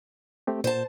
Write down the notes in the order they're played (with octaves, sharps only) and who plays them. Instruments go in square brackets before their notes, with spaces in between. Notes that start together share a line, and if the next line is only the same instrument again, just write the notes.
[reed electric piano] A3 C4 G4
[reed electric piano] A#2 [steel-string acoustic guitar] C5 A5